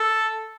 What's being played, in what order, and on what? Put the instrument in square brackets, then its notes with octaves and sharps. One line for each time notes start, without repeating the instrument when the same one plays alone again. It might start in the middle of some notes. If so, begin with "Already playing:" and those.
Already playing: [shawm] A4